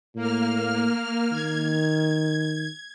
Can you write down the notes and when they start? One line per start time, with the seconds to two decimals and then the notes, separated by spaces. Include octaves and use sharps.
0.15 A2 A#3 F6
1.32 D#3 G#6